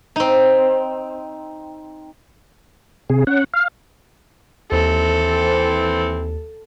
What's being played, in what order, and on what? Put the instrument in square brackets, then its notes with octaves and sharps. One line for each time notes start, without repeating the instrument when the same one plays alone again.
[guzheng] C4 D#4
[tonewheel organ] C3 G#4
C#4 F#5
F5
[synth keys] D#2 [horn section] E3 C4 [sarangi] A4